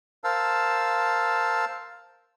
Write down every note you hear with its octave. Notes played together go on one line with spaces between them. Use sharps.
A#4 C5 F5 A5 E6